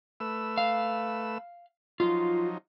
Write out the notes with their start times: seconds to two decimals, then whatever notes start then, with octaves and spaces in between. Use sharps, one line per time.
0.20 A3 B4 E6
0.58 F5
2.00 F3 F#3 D#4 F4